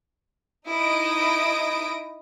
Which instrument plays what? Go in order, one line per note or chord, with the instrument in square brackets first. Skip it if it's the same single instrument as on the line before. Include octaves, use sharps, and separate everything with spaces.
[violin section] D#4 E4 D#6 A#6 D7